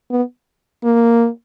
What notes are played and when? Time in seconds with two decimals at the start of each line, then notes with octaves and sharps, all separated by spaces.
0.11 B3
0.84 A#3